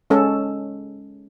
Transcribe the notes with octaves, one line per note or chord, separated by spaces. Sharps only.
G#3 C#4 A4